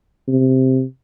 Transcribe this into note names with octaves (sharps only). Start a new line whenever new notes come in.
C3